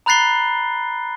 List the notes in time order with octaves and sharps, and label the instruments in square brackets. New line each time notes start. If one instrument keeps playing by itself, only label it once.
[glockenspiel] A#5 B5 F#6 A6 C7 G7